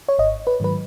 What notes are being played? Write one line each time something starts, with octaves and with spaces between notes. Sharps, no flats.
C#5
G#1 D#5
B4
G#2 D#3 F#3 B4